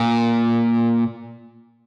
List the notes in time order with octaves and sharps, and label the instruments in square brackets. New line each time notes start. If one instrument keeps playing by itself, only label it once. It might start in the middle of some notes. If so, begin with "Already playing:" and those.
Already playing: [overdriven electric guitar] A#2